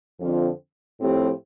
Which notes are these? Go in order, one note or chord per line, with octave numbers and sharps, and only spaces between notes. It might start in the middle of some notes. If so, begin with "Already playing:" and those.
F2 D3 F3 C4 F4
A2 F3 C4 G4